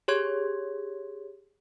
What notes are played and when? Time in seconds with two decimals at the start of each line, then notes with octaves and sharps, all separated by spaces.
0.08 G4 G#4 C#5 C6 G#6